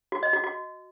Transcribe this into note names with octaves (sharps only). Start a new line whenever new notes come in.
F#4
D#5
F#4
F#4